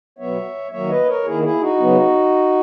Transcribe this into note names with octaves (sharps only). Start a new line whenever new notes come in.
B2 F#3 B3 C#5 E5
D#3 F#3 A#3 C#5 E5
B4 D#5
A#4 C#5
D#3 A#3 E4 G#4
E4 G#4
D#4 F#4
C#3 F#3 B3